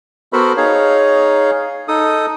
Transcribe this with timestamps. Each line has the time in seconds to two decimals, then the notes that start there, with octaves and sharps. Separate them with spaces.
0.33 B3 F#4 A4 A#4 C5 B5
0.57 D#4 G#4 C#5 F5
1.88 D#4 A4 D#6